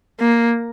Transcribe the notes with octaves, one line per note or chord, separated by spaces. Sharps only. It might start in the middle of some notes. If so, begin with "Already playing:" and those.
A#3